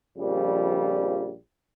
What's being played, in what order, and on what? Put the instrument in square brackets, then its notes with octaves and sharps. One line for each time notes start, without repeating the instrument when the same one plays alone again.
[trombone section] A#1 F2 C#3 G3